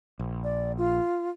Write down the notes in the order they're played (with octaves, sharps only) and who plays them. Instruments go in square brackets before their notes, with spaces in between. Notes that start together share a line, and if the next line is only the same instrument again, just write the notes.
[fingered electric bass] A#1
[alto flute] D5
F4